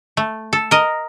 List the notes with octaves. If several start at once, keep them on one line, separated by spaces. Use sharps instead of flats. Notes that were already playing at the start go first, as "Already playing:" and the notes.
A3
A4
A#4 D#5